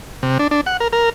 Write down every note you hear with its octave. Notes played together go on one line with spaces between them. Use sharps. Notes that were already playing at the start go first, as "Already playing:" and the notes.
C3
D4
D4
F#5
A#4
A#4